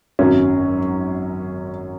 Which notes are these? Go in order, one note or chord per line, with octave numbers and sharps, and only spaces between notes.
G#1 F#2 F#3 C#4